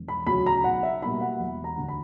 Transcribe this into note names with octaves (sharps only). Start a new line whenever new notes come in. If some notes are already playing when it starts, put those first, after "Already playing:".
Already playing: E1
B5
D2 C#3 F#3 B5
A#5
B1 F#5
E5
B2 G3 A#3 E4 B5
F#5
E1
A#5
D2 D3
B5